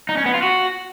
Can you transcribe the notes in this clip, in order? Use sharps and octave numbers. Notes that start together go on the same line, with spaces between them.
D#4
C#4
B3
F4
F#4